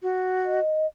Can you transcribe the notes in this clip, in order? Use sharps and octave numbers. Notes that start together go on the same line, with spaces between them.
F#4
D#5